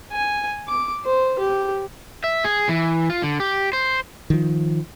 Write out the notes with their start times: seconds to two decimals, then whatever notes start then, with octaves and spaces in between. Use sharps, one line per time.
0.12 G#5
0.68 D6
1.05 C5
1.39 G4
2.24 E5
2.45 G#4
2.69 E3
3.10 F4
3.23 D3
3.40 G4
3.73 C5
4.30 D#3 F3